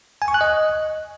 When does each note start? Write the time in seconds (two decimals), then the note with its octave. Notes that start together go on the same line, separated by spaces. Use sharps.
0.22 G#5
0.28 C#6
0.34 F#6
0.41 D#5